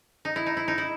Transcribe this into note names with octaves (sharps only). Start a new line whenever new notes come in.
D#4
E4
D#4
E4
D#4
E4